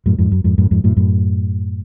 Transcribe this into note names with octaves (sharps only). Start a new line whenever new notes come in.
F#2 A2
F2 G#2
F#2
F2 G#2
F#2 A2
F2 G#2
F#2 A2
F#2 A2